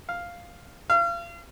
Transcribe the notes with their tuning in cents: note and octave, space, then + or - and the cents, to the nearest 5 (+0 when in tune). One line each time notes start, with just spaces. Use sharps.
F5 +0
F5 -35